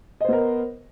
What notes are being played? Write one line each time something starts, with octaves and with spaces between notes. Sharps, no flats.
B3 A#4 C5 D#5